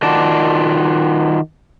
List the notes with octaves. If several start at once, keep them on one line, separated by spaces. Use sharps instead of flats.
D#3 F4 F#4 D5 A5